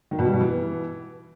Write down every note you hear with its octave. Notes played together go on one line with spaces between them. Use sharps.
D#3
B2
G3
B2
E3